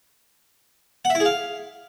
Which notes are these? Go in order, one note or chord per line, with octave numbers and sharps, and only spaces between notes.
F#5
E5
E4
G#4
F5